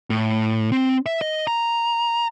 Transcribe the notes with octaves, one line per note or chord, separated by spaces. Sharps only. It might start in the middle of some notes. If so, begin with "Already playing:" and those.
A2
C4
E5
D#5
A#5